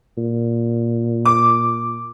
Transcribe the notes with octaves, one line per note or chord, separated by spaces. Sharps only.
A#2
D6